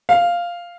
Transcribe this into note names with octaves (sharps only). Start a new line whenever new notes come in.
F5